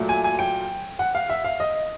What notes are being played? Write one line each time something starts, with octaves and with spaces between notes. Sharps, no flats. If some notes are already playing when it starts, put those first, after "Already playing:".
Already playing: A#2 F#3 A3
G#5
G#5
G5
F#5
F5
E5
F5
D#5